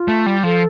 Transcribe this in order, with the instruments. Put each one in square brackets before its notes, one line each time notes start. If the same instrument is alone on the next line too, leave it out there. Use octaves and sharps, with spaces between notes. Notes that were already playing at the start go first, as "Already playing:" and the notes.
Already playing: [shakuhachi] F4
[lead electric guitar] A3
G3
[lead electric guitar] F3 [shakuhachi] A4